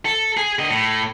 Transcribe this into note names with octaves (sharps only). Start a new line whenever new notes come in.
A4
G#4
D3 D#5
A2